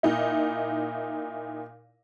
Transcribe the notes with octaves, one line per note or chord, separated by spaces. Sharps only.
A#2 D#4 E4